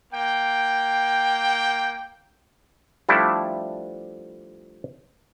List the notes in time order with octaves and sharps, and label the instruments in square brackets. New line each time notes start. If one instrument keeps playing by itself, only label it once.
[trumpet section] A#3 G5
[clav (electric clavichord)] F3 G3 A3 D4 E4